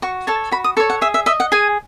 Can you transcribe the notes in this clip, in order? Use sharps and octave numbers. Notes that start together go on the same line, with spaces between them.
F#4 C#6
A4 C#5 A5
F#4 B5
D#6
A4 C#5 C#6
F#5
G#4 E5
E5
D#5 E5
F#5
G#4 G#5